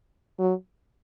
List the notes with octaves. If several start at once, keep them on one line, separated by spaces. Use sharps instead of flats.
F#3